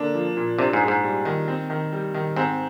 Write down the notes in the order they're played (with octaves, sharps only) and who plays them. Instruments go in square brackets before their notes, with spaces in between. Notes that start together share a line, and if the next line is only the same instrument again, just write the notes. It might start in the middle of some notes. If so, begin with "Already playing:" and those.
Already playing: [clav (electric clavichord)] D3 [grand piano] A#3 D4
[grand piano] F3
A#2
[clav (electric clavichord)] C3 [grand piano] D4
[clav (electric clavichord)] G#2
[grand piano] G#4
[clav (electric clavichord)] G#2
[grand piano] G3
D#3
C4
D#3
G3
D#3
[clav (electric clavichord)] G#2 [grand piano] C4